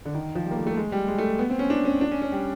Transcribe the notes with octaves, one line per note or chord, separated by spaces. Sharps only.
D3
D#3
F3
G3
A#3
A3
A3
G#3
G3
G#3
A3
B3
C4
C#4
D4
C#4
D4
C#4
C#4
G3